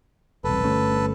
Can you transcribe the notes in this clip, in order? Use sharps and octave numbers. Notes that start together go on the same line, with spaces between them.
E1 C2 A4 B4
G1 A3 C#4